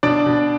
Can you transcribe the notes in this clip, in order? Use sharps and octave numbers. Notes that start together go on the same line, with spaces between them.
B2 D4 D5
B2